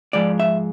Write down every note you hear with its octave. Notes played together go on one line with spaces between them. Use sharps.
G#2 F3 G#3 D5
E5